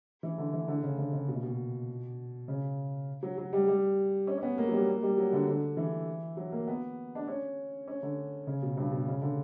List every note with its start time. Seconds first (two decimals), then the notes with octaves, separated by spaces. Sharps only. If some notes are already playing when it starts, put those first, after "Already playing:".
0.23 E3
0.38 D3
0.53 E3
0.68 D3
0.83 C#3
0.98 D3
1.13 C#3
1.28 B2
1.35 A#2
1.43 B2
2.48 C#3
3.23 F#3
3.38 F#3
3.53 G3
3.68 G3
4.27 C#4
4.38 C#4
4.43 B3
4.58 A#3
4.68 F#3
4.73 G3
4.88 A#3
5.03 G3
5.18 F#3
5.33 D3
5.48 D3
5.77 E3
6.37 F#3
6.52 A#3
6.68 B3
7.15 D4
7.28 C#4
7.88 C#4
8.03 D3
8.47 C#3
8.62 B2
8.77 G2
8.92 B2
9.08 C#3
9.22 D3